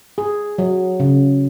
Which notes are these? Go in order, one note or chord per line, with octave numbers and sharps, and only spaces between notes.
G#4
F#3
C#3